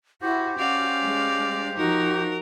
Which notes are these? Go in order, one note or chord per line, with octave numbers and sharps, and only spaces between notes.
E4 F#4 G4 C5
C#4 F#4 D5 F5
G#3
F3 D#4 F#4 A#4